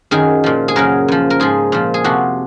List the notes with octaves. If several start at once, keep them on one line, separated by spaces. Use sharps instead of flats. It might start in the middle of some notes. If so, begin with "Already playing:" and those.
F#2 D#3 F#3 G#4
A#2 F3
G#4
F#2 C#3 F#3 A#4
F#2 F3
A#4
G#2 F3 G#4
A#2 F3
G#4
F2 C3 F3 F#4